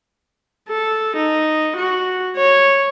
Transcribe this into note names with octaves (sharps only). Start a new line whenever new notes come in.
A4
D#4
F#4
C#5